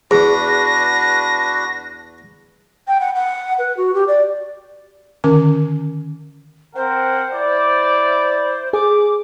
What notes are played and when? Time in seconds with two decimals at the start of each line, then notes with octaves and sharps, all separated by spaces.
0.11 E2 D4 F#4 G#4 B4 A#6
2.88 G5
3.00 F#5
3.15 F#5
3.59 B4
3.77 F#4
3.94 G4
4.08 D5
5.24 D3 D#3 C#4 A#4 D6
6.76 C4 A#4 C5 F#5
7.32 E4 D5
8.73 G#4 D6